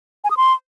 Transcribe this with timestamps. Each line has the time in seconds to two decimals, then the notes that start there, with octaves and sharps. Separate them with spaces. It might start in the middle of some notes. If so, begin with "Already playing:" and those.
0.24 G#5
0.31 D#6
0.37 C6